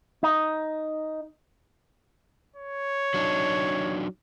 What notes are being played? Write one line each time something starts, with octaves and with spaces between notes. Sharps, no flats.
D#4
C#5
F#3 D4 D#4